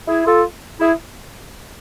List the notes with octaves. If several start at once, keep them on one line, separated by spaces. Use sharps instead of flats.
E4 G#4
F4 A4
E4 G#4